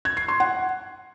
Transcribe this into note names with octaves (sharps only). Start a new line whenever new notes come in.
G#6
C7
C6
F#5